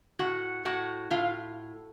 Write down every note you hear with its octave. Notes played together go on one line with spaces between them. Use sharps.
A2 F#4 F#5
A2 F#4 F#5
A2 F4 F5